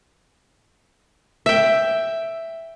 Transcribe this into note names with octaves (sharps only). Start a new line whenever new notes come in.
E5 G5